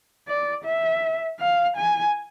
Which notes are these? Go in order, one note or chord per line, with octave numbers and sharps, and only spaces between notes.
D5
E5
F5
G#5